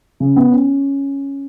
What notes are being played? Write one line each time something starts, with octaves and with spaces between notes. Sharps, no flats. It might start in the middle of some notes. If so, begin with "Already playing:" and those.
C#3
B3
C#4